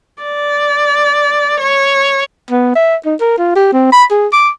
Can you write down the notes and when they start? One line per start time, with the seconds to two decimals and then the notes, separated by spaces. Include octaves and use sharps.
0.23 D5
1.60 C#5
2.51 B3
2.75 E5
3.06 D#4
3.21 A#4
3.38 F4
3.56 G4
3.73 C4
3.92 B5
4.11 G#4
4.32 D6